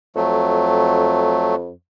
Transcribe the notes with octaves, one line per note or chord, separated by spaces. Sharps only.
F2 F#3 A3